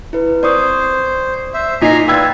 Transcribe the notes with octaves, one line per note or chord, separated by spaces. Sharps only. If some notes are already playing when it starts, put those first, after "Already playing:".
E4 B4
C4 C5 D5 C#6 D#6
C5 E5
A#2 D#4 G#5 A#5 B6 C7
F4 B4 D5 G5 E6 G#6